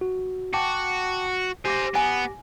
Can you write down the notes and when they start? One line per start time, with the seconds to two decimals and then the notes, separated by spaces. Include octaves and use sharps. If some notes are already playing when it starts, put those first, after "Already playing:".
0.01 F#4
0.54 F#4 G5 A5 D6
1.66 G4 C5 G#5 D6 A#6
1.95 B3 G#5